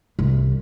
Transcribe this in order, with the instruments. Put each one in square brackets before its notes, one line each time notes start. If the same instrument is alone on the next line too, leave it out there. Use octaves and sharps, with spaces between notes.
[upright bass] C2